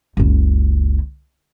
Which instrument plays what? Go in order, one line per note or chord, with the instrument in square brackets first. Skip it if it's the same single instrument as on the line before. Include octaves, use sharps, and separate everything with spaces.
[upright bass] F#1 C#2